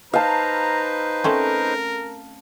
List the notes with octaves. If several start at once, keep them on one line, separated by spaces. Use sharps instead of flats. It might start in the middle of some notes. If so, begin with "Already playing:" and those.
D#4 B4 C5 F5 A5 A#5
A3 C4 C#4 A#4